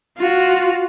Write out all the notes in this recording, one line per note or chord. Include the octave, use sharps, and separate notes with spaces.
F4 F#4